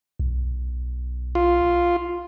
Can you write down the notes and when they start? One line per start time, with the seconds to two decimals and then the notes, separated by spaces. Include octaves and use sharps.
0.19 B1
1.35 F4